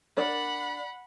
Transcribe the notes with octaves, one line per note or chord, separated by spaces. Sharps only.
D4 A#4 D5 F#5 B5